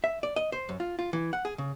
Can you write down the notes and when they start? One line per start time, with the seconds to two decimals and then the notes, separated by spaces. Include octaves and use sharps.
0.04 E5
0.23 D5
0.36 D#5
0.52 C5
0.69 F#2
0.80 F4
0.99 F4
1.13 E3
1.33 F#5
1.45 G#4
1.58 C#3